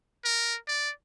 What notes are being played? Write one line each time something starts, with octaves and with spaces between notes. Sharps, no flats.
A#4
D5